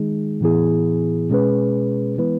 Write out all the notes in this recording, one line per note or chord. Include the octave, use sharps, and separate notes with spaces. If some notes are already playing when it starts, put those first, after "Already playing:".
Already playing: D#3 G#3 D#4 G#4
A2 E3 B3 E4 G#4
B2 G#3 C#4 G#4 B4
E3 G#3 B3 E4 B4